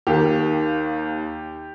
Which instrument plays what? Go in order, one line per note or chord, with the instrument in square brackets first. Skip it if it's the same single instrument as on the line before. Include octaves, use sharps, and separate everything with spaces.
[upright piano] D#2 D#3 A#3 G4